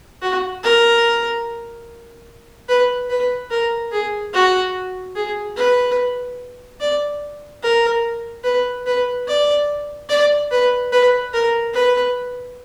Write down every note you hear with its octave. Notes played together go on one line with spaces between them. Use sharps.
F#4
A#4
B4
B4
A#4
G#4
F#4
G#4
B4
D5
A#4
B4
B4
D5
D5
B4
B4
A#4
B4